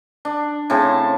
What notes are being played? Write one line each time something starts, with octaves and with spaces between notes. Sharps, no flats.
D4
A2 C#3 C4 A5